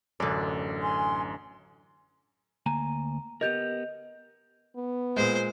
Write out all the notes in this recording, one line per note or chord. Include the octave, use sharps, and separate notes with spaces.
A1 F#2 D3 D5
G#5 C6
D2 A#3 G#5 A#5
B3 G4 A#4 D#5 G6 F7
B3
A#2 G#3 C5